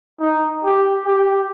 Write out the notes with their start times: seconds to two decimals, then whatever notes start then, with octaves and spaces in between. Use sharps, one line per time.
0.20 D#4
0.65 G4
1.06 G4